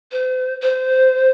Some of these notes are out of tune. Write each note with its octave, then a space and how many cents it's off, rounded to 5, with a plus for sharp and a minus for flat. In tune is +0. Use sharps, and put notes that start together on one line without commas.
C5 -40
C5 -20